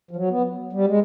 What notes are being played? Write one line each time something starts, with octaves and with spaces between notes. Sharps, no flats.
F3
F#3
B3
G3
G#3